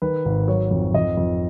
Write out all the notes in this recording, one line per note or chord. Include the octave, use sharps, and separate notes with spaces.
D#3 B4
G#1
F#3 C#5
F2
F2 D#5
F2